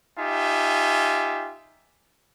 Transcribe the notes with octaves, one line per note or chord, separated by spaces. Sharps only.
D#4 F4 G4 E5 G#5